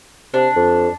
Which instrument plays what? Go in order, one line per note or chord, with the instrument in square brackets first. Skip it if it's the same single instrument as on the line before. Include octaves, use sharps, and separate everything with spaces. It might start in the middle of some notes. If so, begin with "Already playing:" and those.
[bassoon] C3 [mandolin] D4
[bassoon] F2